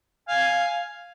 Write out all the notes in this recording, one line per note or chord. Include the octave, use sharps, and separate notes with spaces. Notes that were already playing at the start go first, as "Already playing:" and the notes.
F5 G#5